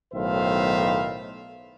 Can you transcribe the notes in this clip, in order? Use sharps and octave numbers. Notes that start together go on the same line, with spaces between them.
B1 A2 D#3 C5 E5 F5